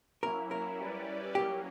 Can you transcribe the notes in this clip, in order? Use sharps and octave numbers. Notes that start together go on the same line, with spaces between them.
F#3 A#3 C#4 E4 A#4
A#4
G3 C#4 E4 B4 D5
F#3 A#3 C#4 G4